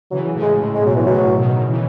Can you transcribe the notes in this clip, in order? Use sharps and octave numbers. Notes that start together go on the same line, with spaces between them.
C#3 E3 F#3
A2 C#3
G#3
A2
G#3
B2 F#3
B2 E3
A2 C#3 F#3
B2 D#3
C#3 E3